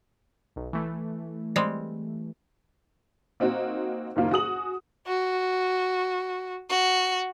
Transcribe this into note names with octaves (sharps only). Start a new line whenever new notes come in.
B1
E3 A3
G3 G#3 C4
A#3 C4 D#4 F#4
F#1 D#3 A#3 F4
F#4 G#4 D#6 F#7
F#4
F#4